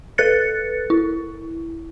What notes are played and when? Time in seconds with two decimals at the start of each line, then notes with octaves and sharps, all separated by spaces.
0.18 A4 B4 F#6 A6 C#7
0.90 E4